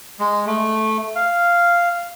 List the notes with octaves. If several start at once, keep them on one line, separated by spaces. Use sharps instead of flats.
G#3
A3
F5